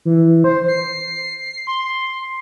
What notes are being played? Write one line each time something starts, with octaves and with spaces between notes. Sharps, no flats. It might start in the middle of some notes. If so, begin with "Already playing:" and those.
E3
C5
C7
C6